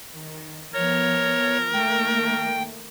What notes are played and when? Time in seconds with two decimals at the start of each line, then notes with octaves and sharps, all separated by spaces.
0.11 D#3
0.74 F3 B3 A#4 C#5
1.73 D#3 A3 A#3 G5